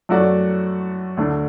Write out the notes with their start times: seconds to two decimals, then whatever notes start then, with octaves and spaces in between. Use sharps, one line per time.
0.09 F#2 F#3 A3 F#4 D5
1.17 D2 D3 A3 D4 A4